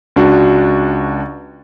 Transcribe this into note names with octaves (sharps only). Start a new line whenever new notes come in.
C#2 D4 F#4